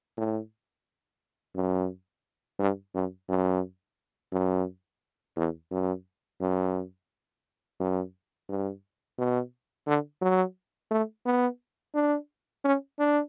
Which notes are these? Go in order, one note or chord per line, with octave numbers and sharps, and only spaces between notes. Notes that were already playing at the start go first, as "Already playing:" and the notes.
A2
F#2
G2
F#2
F#2
F#2
E2
F#2
F#2
F#2
G2
B2
D3
F#3
A3
B3
D4
C#4
D4